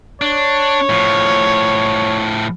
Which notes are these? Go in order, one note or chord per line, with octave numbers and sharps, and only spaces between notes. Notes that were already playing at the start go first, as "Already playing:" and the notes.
D4 C#5
A2 F3